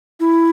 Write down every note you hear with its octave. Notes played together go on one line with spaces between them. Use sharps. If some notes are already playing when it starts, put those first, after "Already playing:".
E4